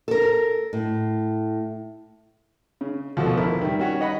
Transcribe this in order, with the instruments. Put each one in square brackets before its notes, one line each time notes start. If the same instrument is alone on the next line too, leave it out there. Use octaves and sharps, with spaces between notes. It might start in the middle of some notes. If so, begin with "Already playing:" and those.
[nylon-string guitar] A4 A#4
A2
[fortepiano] C#3
[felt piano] D#1 B2 A4 [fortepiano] F3 F#4
[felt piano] C#2 F3 A#4 [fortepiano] E4
[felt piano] D#3 G3
[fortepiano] C#4 F#4 C#5
D#5 F#5 B5